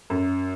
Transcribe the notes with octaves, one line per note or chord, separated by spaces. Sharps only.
F#2